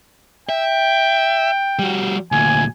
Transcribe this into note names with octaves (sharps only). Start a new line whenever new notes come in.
E5 G5
G3 F#4
D2 A#2 G#5